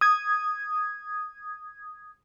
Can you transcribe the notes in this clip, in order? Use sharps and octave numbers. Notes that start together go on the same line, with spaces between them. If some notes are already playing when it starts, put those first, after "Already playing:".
D#6 G#6